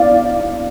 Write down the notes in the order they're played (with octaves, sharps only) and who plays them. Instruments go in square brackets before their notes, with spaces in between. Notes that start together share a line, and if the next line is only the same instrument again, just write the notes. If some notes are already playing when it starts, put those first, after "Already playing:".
Already playing: [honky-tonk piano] D5 F5